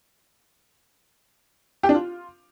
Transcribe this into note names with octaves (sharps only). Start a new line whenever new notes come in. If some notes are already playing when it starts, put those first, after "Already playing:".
G4
D4
F4